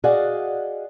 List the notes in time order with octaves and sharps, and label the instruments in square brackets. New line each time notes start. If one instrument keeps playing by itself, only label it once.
[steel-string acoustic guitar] F#4 G#4 D5 D#5 F5 F#5